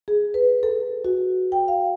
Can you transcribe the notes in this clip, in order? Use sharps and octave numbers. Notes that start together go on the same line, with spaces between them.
G#4
B4
A4
F#4
G5
F5